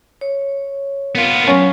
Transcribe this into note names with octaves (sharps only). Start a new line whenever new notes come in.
C#5
B3 F4 A#4 F5
F#3 C#4